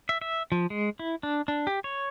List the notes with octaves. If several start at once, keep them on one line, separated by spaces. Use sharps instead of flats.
E5
E5
F3
G#3
E4
D4
D4
G4
C#5